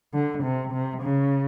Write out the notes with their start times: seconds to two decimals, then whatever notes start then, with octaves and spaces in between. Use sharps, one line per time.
0.14 D3
0.44 C3
0.73 C3
1.02 C#3